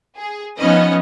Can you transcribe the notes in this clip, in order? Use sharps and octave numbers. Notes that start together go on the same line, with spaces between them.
G#4
F3 B3 C#4 D#4 B4 D#5